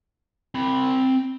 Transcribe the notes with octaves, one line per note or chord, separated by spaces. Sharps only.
C4 B5